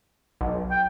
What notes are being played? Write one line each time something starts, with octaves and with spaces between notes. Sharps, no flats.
B1
G5